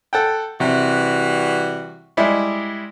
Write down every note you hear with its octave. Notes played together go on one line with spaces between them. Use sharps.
A4 F#5 G5
C3 E3 G3 F#4
G3 G#3 E4